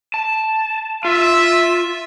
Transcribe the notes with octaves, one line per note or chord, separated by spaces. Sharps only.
A5
F4 E5